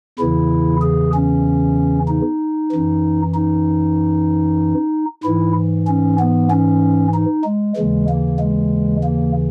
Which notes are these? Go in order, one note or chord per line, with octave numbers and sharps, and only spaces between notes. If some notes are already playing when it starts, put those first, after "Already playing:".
E2 C#3 E3 E4
G#4
C#4
D#4
F#2 E3
D#4
G#2 E3 E4
C#4
B3
C#4
D#4
G#3
D#2 C#3 E3 G#3
A#3
G#3
A#3